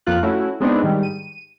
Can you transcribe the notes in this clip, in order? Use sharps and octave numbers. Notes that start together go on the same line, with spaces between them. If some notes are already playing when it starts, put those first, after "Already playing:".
F2 A#3 F4 F#6
A3 C#4 E4 F#4
G#3 B3 C4 D4 D#4
G#2 D#3 G3
D#7